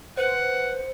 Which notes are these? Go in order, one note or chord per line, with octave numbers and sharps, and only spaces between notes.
B4 C5 F#5